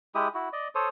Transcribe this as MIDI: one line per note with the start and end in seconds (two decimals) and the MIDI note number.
0.15 0.28 56
0.15 0.28 64
0.15 0.28 67
0.15 0.28 87
0.34 0.49 64
0.34 0.49 66
0.53 0.68 74
0.53 0.68 75
0.75 0.89 69
0.75 0.89 72
0.75 0.89 73
0.75 0.89 87